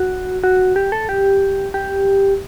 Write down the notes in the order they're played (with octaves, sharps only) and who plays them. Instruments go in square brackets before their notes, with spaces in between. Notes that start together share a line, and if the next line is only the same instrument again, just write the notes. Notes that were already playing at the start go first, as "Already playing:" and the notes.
Already playing: [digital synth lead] F#4
F#4
G4
A4
G4
G4